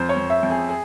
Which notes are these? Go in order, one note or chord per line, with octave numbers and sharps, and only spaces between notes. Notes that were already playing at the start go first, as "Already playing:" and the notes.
Already playing: F2 C5
C#5
F2
E5
F2
G#4
G#4